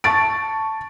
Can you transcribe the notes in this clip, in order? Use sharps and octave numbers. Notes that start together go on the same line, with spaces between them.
A5 C#6 A6 D7